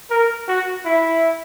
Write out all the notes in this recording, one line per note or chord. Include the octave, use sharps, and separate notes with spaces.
A#4
F#4
E4